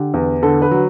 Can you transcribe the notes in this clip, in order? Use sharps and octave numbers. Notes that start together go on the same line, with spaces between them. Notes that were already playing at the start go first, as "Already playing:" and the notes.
Already playing: D3 G4
E2
D3 A4
B4
F#3